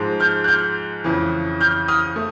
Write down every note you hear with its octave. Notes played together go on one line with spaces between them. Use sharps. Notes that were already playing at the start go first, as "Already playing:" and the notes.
Already playing: G#2 F3 G#3
F6 G6
F#6
F6 G6
F2 C#3 E3
F6 G6
D#6 F6
A3